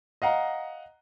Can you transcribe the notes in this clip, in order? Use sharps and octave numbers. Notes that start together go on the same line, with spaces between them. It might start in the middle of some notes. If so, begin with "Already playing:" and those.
D#5 F5 F#5 A#5